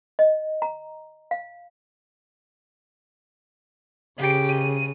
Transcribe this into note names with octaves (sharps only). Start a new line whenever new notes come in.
D#5
A#5
F5
C#3 G4 D7
D#7